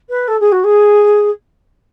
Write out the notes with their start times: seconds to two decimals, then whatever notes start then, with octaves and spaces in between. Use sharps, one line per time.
0.09 B4
0.27 A4
0.40 G#4
0.52 F#4
0.64 G#4